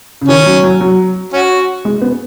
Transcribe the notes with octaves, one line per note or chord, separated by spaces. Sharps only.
C#3
D#3 C#4
F#3
F#3
F#3
C#4 F#4
G#3
B3